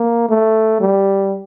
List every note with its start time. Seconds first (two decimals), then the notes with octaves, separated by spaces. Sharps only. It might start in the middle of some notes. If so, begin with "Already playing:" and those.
Already playing: A#3
0.29 A3
0.81 G3